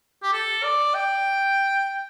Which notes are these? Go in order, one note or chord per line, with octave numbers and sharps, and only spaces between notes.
G4
A4
D5
G5